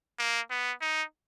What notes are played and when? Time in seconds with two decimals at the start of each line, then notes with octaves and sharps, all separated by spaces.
0.19 A#3
0.50 B3
0.81 D#4